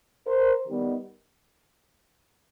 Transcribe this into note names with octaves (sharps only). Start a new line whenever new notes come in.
A#4 C5
D#3 G3 B3